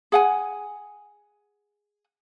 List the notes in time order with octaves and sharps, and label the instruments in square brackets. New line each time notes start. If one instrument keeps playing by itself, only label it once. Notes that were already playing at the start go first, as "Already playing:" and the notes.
[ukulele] G#4 F#5 G#5